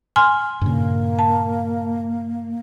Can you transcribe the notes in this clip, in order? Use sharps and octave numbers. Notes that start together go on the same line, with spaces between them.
G#5 C6 F6
G2 A#2 C#3 A#3
A5